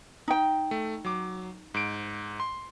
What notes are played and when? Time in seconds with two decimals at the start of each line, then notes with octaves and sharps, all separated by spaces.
0.28 D#4 G5
0.71 A3
1.05 F#3 D6
1.74 G#2 D7
2.40 C6